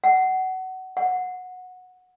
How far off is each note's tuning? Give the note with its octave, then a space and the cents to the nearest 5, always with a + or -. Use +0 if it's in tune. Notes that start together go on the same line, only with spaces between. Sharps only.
F#5 +25
F#5 -15